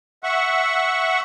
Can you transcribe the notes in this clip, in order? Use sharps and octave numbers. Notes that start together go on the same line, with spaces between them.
E5 F#5 C#6